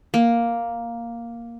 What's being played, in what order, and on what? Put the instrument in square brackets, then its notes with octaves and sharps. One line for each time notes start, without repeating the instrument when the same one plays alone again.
[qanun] A#3